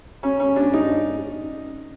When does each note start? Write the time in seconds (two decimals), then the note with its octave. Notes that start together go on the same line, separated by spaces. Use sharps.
0.23 C#4
0.40 C#4
0.56 D4
0.74 D#4